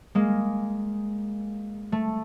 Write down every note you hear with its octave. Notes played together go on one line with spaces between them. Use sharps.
G#3 A#3
A3